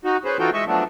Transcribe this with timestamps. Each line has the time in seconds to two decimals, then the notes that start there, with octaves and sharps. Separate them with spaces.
0.05 D#4 F#4
0.25 C#4 G#4 B4 C5
0.39 E3 D#4 F4 F#4 A4 G5
0.53 G#3 D#5 E5 C#6
0.67 F3 F#3 A3 B3 D4